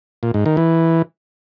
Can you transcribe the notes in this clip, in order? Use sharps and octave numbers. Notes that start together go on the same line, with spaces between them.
A#2
G#2
D#3
E3